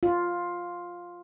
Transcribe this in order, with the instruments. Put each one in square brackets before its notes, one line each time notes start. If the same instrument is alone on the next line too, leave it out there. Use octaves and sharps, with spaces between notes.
[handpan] F4